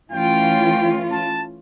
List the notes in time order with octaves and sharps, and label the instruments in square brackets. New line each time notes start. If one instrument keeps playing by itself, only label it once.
[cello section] E3 A3 C#4 F4 [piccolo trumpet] G5
[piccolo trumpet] A5